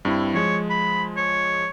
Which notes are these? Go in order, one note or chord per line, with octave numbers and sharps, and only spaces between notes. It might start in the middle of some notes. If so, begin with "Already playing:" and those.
G2 C4 E4
F3 G#3 C#5
B5
C#5